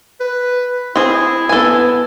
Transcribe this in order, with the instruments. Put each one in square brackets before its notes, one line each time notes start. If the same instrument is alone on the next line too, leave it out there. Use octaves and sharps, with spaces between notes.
[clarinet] B4
[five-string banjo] C4 G#4 [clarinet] E4
[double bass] B3 [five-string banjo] A4 G#5